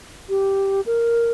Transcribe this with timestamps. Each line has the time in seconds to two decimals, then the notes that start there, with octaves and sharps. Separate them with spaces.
0.29 G4
0.86 A#4